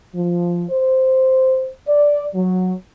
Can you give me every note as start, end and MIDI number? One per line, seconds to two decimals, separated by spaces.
0.14 0.65 53
0.70 1.69 72
1.88 2.26 74
2.34 2.73 54